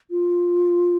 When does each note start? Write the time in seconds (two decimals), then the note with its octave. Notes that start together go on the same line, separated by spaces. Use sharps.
0.11 F4